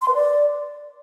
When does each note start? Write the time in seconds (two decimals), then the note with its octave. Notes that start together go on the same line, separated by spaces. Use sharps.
0.02 C6
0.08 B4
0.15 D5